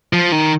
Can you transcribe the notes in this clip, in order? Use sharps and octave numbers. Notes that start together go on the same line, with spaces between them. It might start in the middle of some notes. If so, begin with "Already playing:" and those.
F3
D#3